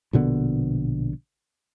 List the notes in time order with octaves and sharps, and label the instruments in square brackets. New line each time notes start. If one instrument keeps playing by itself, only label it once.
[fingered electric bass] A#1 B2 D3 B3